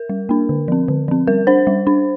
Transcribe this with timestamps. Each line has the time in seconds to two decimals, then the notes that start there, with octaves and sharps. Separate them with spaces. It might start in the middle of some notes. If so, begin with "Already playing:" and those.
Already playing: A#4
0.10 G3
0.29 A#3 D4
0.49 D3
0.68 F3 C4
0.88 D3
1.08 F3 C4
1.27 G3 A#4
1.47 D4 C5
1.67 G3
1.87 D4